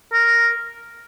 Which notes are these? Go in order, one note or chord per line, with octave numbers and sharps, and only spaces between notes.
A#4